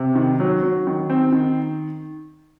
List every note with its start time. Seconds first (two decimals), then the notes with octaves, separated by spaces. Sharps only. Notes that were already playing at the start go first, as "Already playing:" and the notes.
Already playing: C3
0.15 D#3
0.40 F#3
0.63 F#3
0.87 D#3
1.10 C4
1.32 D#3